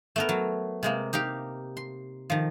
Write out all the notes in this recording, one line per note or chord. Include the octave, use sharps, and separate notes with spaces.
A3 B3 A#4
F#3
C3 G#3 A#3
D#4 G4 F5 G5
C6
D#3 F3